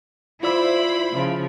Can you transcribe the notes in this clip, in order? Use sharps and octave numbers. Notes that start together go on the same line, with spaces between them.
E4 F4 C5 D5 B5 E6
C#3 F3